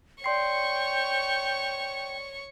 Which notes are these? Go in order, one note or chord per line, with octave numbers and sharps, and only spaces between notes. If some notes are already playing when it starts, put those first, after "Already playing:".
C#5 D5 G5 C6 C#6 C7